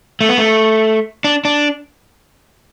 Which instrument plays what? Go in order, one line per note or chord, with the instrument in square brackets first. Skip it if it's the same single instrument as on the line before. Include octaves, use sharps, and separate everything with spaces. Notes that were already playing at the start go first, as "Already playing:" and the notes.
[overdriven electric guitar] A3
B3
A3
D4
D4